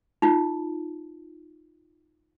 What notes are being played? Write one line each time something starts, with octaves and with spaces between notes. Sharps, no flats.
D#4 F4